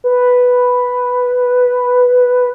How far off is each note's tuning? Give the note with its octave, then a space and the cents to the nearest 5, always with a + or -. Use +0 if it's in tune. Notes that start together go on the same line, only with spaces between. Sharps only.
B4 +0